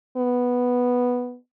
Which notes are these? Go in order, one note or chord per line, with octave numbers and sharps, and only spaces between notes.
B3